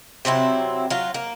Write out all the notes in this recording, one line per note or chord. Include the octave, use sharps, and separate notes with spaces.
C3 F#3 C4 E4
F#3 F4
A#3